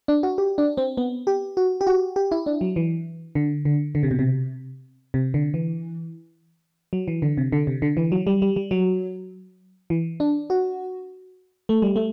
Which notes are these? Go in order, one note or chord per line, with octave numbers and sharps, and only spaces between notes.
D4
F#4
G4
D4
C4
B3
G4
F#4
G4
F#4
G4
E4
D4
F#3
E3
D3
D3
D3
C3
B2
C3
C3
D3
E3
F#3
E3
D3
C3
D3
C3
D3
E3
F#3
G3
G3
G3
F#3
E3
D4
F#4
A3
G3
A3